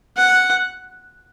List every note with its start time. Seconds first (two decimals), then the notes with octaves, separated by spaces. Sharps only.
0.17 F#5